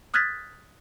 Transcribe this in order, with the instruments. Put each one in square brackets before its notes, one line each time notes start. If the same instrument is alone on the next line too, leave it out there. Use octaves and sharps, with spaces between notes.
[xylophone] D#6 F6 F#6 G#6 A6 B6